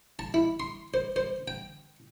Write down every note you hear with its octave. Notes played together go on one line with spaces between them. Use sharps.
A5
E4
C6
C5
C5
G5